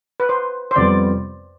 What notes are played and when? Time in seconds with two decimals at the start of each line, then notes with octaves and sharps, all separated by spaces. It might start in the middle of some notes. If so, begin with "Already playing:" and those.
0.20 B4
0.29 C5
0.71 C5
0.76 F2 C3 G3 B3 D5